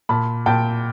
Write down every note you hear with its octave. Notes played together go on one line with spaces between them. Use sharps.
A#2 A5 B5
A#2 G5 A5